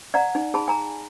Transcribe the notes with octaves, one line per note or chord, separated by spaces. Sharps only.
D5 F#5 A#5
D#4
G#4 A5 B5
G#5 A#5